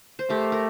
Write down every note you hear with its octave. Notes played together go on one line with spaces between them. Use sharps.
C5
A3 G4 A#4
A#4